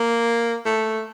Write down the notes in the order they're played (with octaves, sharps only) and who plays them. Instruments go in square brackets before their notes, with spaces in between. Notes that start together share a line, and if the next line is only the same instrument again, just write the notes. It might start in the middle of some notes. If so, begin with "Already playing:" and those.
Already playing: [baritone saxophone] A#3
A3